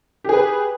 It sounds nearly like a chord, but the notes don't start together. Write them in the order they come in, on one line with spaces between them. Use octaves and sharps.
G4 G#4 B4